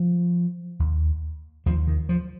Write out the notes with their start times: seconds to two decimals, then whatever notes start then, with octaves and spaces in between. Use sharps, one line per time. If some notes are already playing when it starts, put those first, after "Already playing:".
Already playing: F3
0.79 D#2
1.66 D#2 F3
1.87 D#3
2.09 F3